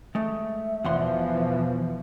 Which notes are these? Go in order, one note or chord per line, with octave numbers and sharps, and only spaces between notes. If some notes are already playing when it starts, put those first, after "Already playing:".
G#3 A3 E5
E2 B2 E3 F3 F#5 C6